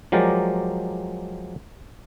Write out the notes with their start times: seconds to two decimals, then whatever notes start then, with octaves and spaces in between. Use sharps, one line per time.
0.12 F3 F#3 G#3 G4 A#4 D5